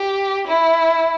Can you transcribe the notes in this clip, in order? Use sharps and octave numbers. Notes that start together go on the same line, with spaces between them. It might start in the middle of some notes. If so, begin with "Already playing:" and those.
Already playing: G4
E4